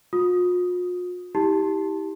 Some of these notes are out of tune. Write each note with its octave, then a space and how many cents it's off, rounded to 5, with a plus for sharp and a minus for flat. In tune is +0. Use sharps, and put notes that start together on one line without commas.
F4 +45 D#6 +0
E4 -40 G4 +0 A5 +0